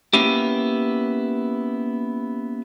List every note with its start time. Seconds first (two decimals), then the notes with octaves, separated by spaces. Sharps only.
0.13 A#3 B3 C#4 E4 G4